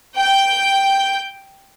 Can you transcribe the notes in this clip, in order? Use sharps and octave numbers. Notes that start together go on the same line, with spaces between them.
G5 G6